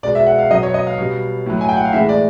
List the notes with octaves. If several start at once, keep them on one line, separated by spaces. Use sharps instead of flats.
B2 G#3 D5
E5
F#5
F5
B2 F#3 D#5
C#5
D#5
F5
B2 G3
A2 F#3
G#5
G5
F#5
F5
A2 E3 G#3 E5
D5